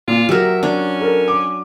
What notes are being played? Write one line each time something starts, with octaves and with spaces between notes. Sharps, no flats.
A#2 F4
F#3 G4 A#4 E5
C#4 D4
A4 A#4
D6